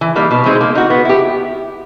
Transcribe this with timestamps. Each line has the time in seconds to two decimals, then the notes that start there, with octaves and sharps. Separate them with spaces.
0.01 E3
0.16 G3 A#3 D#4
0.31 B2
0.45 G#3 C4 D#4
0.61 A#3
0.75 D#4 F#4
0.90 B3
1.05 E4 G4